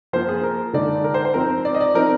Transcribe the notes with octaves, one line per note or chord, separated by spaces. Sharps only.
F3 A#3 F4 C5
G#4
A#4
D3 G#3 D#4 D5
A#4
C5
C5
F3 C4 D#4 A#4
D5
D#5
D5
F3 C4 D#4 A#4